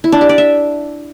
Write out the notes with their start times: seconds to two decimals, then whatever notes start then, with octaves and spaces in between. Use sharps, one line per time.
0.04 E4
0.12 D4
0.21 G4
0.29 D5
0.38 E5